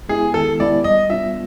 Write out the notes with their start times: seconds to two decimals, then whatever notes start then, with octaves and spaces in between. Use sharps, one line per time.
0.09 G#3 B3 E4 G4 G#4
0.34 D#3 A4
0.60 G#3 B3 E4 G4 D5
0.84 G3 D#5
1.10 B3 D4 F4 E5